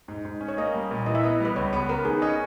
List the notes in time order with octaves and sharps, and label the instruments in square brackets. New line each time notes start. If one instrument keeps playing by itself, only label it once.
[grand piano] G#2
G#2
C#4
[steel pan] C#5
[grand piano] A#3 [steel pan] D#5
[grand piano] G3
A#2
[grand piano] E3 [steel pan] D#5
[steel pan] E5
[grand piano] B3 [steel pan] D#5
[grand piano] G3 [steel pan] B4
[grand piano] C#2 [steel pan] C#5
[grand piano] B3 [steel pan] B4
[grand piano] B3 [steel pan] A#4
[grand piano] D#3 [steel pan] G#4
[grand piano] C#4 [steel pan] D#5